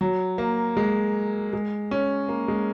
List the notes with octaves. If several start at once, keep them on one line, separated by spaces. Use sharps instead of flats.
F#3
A#3
G#3
G#3
C#4
A#3
G#3